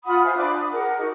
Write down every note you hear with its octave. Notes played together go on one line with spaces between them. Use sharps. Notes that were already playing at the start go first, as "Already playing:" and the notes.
F4 F#5 B5 D#6
C5 E5 F5 G#5
D4 B5 D6 F#6
D#6
G#4 A#4 F#5
D#4 F#4